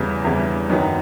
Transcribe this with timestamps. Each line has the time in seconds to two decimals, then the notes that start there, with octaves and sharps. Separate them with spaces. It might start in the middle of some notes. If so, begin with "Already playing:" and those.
Already playing: E2 C#3 E3 G3
0.25 E2 C#3 E3 G3
0.70 F#2 D#3 F#3 B3